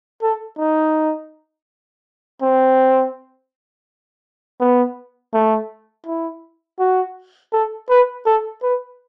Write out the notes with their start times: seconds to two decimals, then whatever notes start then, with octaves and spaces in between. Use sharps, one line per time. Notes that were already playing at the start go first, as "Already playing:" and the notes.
0.22 A4
0.58 D#4
2.42 C4
4.60 B3
5.34 A3
6.06 E4
6.79 F#4
7.53 A4
7.90 B4
8.26 A4
8.63 B4